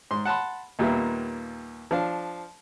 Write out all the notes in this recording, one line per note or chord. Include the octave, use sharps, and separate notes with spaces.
G#2 C6
F#5 A5 B5 C6
D#2 A#2 G3 A#3 B3 E5
F3 D4 F5